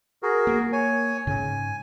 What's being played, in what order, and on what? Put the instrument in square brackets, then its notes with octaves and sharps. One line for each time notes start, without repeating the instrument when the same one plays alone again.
[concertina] F#4 G#4 A#4
[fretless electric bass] A#3
[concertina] C#5 G#5
[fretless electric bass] G#2 C#3 [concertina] G#5